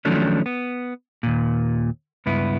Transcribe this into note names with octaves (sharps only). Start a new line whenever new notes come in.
D#3 F3 F#3 A3 C#4 D4
B3
D#2 A#2
C#2 G2 B3 E4